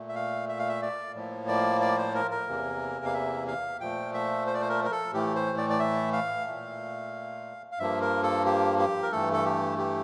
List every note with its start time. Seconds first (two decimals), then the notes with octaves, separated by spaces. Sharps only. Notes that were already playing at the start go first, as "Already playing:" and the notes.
Already playing: A#2 A3
0.09 E5
0.15 F5
0.49 E5
0.59 F5
0.69 E5
0.82 D5
1.15 A2 F3 A#3
1.48 D5
1.81 D5
1.98 C5
2.15 A#4
2.31 A#4
2.48 E2 C3 E3 A#3
3.05 F5
3.14 E5
3.47 F5
3.81 A#2 F3 A3 G5
4.14 E5
4.47 C5
4.54 D5
4.62 C5
4.69 A#4
4.85 A#4
4.92 A4
5.14 A2 E3 A3 G4
5.36 C5
5.58 D5
5.70 D5
5.80 E5
6.13 F5
6.46 A#2 A3
7.72 F5
7.79 G2 F3 A#3 E5
8.01 A#4
8.23 A4
8.46 G4
8.79 G4
9.03 A#4
9.12 G2 E3 A3 A4
9.33 A4
9.45 G4
9.78 G4